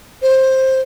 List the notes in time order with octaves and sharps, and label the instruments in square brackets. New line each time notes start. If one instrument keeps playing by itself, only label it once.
[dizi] C5